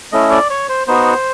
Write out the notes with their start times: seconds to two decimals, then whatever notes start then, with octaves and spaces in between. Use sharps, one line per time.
0.12 A3 C#4 E4 D#5
0.31 D5
0.50 C#5
0.69 C5
0.87 B3 D#4 F#4 C5